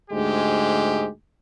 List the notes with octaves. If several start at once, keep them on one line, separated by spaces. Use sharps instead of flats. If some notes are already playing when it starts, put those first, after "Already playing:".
D2 G#2 G#3 G4